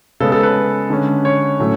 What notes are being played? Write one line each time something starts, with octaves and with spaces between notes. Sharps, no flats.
C#3 G#3 B3 A4
A4
B4
D3 G#3 C#4
C#5
A2 F#3 A3 C#4